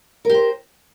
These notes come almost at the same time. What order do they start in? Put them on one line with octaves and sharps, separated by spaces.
A#4 G4 C5